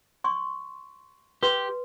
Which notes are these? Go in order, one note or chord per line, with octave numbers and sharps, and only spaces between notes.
C6 C#6
G4 B4 C6